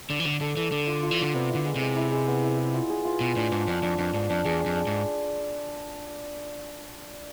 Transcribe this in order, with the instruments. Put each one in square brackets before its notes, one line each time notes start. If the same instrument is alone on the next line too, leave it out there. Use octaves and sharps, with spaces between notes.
[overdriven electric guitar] D3 [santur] D5
[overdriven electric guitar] E3
[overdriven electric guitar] D3 [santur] D5
[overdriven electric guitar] D3 [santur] A4
[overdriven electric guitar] E3 [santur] A4
[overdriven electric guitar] D3 [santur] D5
[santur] F4
F4
[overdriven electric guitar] E3
[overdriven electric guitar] D3 [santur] D5
[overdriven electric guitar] C3 [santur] B3
[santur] E4
[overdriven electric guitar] D3
[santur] G#3
[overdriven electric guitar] C3 [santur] G#3
[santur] E4
G#3
B3
E4
G#4
F4
G#4
F4
[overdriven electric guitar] B2 [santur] G#4
[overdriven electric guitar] A2 [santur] D4
[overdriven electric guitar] G#2 [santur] D4
[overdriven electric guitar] F2 [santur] D4
[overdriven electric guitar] F2 [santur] D4
[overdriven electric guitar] F2 [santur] D4
[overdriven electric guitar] G#2 [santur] D4
[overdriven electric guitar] F2 [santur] D4
[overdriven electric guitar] E2 [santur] G#4
[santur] D4
[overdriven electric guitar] F2
[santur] D4
[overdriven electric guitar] G#2 [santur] D5